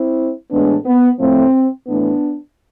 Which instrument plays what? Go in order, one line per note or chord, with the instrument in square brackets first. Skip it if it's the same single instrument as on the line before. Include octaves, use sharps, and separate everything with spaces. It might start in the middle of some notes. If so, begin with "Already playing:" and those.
Already playing: [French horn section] C4 E4
A2 E3 G#3 B3 D4
B3
A2 F3 A3 C4
A2 E3 A3 B3 D4